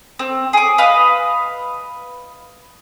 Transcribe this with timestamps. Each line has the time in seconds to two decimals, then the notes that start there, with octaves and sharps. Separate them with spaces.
0.19 C4
0.53 G#4 D6
0.78 B4 D#5 F5